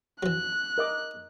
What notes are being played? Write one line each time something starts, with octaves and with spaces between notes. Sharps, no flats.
E3 F#3 F#6
A#4 D#5 D6